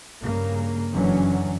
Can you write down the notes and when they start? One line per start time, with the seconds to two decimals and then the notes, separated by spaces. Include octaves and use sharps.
0.22 G2 C#3 A#3
0.91 F#1 D3 E3 F#3 C#4